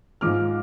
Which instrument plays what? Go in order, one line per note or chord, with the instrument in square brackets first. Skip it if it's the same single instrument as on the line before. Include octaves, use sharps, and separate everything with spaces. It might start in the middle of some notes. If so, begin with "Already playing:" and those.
[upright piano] G#2 F3 G#3 D6 F6